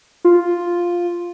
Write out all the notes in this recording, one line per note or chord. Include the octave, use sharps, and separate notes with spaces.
F4